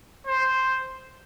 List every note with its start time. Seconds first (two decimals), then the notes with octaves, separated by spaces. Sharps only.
0.27 C5